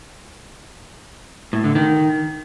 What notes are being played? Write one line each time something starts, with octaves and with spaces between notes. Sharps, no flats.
A2
D3
D#3